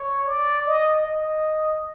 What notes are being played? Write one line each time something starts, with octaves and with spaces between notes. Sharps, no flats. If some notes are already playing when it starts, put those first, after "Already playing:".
Already playing: C#5
D5
D#5
D#5